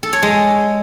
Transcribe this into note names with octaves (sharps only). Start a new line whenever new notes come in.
A4
C#5
G#3